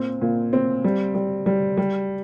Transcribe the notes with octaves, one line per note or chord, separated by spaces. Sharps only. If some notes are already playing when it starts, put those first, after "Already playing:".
Already playing: A#2 C4
A#2
C4
G3
G3
G3
G3